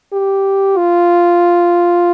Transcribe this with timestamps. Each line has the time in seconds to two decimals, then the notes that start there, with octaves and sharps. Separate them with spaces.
0.13 G4
0.77 F4